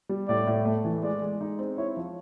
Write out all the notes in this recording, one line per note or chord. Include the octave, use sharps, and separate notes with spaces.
G3
A2 D5
A2
A3
E3
G#3 D5
G#3
D#4
C4
E4 C#5
F3